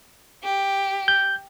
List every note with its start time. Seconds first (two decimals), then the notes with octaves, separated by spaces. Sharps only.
0.44 G4
1.08 G6